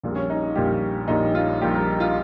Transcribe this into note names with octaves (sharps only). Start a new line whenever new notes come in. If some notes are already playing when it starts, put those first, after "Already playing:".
A#1 A#2 G3
C#4
D#4
A#1 A#2 G3 G4
A#1 A#2 G3 D#4
F4
A#1 A#2 G3 G4
A#4
F4